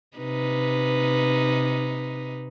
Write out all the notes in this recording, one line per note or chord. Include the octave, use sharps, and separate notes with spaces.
C3 D#4 B4